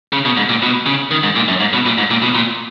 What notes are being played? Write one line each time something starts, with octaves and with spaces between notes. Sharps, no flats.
C#3
B2
G#2
A#2
B2
C#3
D#3
G#2
A#2
F#2
G#2
B2
A#2
G#2
A#2
B2
A#2